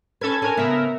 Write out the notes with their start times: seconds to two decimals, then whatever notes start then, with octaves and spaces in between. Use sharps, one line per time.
0.21 C#4 A4 B4 G#6
0.42 C#4 D4 A4 A#4 G#5
0.57 C#3 B3 A#4 E5